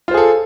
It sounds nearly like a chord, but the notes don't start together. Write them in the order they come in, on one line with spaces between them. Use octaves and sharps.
F4 C5 G#4 A4